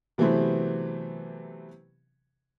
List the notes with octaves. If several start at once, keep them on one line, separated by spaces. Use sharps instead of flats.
C3 E3 F#3 A3 B3 C4